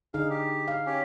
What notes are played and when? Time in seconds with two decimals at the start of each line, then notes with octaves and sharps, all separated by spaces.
0.14 D3 D#4 G#4 F5
0.30 G4
0.68 F5
0.86 C#4 G4